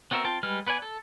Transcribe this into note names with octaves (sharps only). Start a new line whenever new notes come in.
B3 C4 F#4 A#4 E5
C4 F4 G5 A5
G3 G#3 B4 F6
B3 B4 D5 G#5
A4